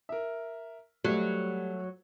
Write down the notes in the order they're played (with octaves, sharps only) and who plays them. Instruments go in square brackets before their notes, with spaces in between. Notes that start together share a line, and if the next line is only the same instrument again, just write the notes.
[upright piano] A#4 E5
[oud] F#3 [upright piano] G3 [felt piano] A3